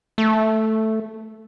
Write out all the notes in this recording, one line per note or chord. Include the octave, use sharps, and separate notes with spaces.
A3